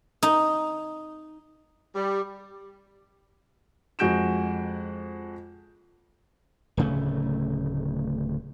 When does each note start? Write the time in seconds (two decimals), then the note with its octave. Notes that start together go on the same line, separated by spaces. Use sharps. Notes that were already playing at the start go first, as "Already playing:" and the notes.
0.23 D#4
1.95 G3
3.99 F2 G#3 F#4 G6 D7 E7
6.77 D1 C#3 A3